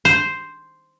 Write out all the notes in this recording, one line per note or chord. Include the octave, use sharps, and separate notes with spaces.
C5